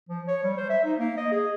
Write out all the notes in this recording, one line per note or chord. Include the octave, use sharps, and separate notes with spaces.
F3
C#5
G3
C5
E5
D#4
A#3
D#5
G#4